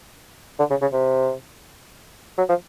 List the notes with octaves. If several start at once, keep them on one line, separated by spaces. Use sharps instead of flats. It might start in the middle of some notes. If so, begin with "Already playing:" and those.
D3
C#3
C#3
C3
F#3
F3